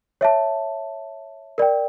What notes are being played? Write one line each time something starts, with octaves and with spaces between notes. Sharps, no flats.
C#5 E5 A5
A#4 D5 G5